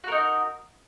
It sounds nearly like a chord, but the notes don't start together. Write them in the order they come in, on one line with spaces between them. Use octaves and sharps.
F#4 A#4 D#4